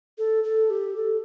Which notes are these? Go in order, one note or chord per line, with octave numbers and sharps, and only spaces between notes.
A4
A4
G4
A4